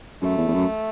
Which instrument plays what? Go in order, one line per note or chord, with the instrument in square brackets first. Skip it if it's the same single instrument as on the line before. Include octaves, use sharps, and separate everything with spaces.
[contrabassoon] F#2 [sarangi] A3
[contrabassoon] E2
E2
F#2